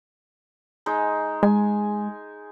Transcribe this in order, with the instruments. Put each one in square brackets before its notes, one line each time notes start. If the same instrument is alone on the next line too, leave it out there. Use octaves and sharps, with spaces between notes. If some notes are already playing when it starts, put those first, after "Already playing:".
[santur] G#3 D#4
[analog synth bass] G#3 [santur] G#5